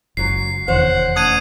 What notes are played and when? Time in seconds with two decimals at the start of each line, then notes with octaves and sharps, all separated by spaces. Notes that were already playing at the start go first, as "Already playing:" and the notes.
0.17 F#1 G#2 F#3 C7
0.68 F1 E2 D#3 C5 C#5 F#5
1.16 D2 C#4 F#5 A5 D#6 G#6 D#7